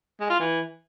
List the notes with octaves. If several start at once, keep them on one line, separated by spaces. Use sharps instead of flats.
G#3
F4
E3